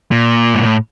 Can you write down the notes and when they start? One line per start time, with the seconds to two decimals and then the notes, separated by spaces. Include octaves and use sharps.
0.11 A#2
0.54 G#2
0.63 A2